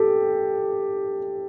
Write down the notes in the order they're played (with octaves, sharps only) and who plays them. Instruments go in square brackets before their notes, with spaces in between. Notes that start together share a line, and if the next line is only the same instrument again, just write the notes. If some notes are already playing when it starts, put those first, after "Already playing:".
Already playing: [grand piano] G4 A4